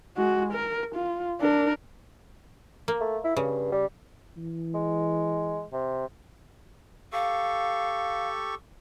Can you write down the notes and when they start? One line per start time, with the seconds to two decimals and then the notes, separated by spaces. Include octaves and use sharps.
0.17 G#3 F#4
0.53 A#4
0.95 F4
1.41 D4 A#4
2.88 A#3
3.00 A3
3.24 E4
3.37 G2 C#3
3.72 G3
4.37 E3
4.74 G#3
5.73 C3
7.13 G4 A4 F5 C#6